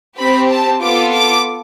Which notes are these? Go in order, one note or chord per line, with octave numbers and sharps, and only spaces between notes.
C4 G4 B5
A5
B3 F4 A4 D6
D6